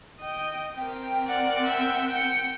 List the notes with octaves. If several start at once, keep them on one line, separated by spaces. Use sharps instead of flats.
D#5 G5
C4 A#4 G5
D5 F#5
E5 G5
G5 C#7